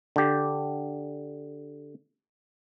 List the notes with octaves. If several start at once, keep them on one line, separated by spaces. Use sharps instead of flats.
D3 G4